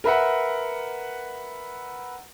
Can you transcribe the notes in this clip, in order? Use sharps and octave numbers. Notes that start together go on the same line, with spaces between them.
A#4 B4 E5 F#5